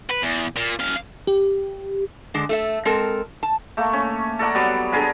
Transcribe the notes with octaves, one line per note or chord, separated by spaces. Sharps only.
B4
E2
A#2
F#2 F5
G4
D3 G#3 D4
A3 A4 E5
G#3 C4 A4 A#4
A5
A3 A#3
C#4
A4 A#4 D5 F#5
F#3 G3 B3
D3 G#4 A#4 B4